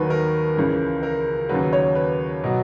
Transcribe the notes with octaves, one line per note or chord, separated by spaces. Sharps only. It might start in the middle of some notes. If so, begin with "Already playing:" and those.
Already playing: D#2 D#3 F#3 B4
A#4
C#2 C#3 E3
A#4
D#2 C#3 F#3 B4
C#5
B4
B2 F#3